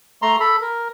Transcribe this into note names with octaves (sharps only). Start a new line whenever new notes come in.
A3 A#5 C6
A4 B5
A#4